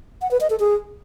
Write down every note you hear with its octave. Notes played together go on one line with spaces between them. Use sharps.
F#5
B4
D#5
A4
G#4